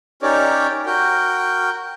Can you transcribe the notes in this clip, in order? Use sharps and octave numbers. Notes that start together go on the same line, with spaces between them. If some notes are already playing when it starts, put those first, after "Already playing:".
C#4 D#4 G4 A#4 C#5 D5
F#4 A#4 G5